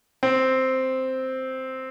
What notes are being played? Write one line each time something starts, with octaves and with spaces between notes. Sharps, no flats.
C4